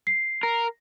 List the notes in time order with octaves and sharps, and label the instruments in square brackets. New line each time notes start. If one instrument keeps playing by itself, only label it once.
[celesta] C7
[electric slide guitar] A#4